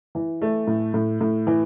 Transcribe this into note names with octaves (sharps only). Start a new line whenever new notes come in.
E3
A3
A2
A2
A2
E3